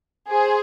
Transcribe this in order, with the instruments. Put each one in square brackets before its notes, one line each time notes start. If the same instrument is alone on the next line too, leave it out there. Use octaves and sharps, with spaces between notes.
[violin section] G#4 C5